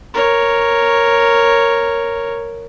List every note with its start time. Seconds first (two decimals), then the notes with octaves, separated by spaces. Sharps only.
0.14 A#4 C#5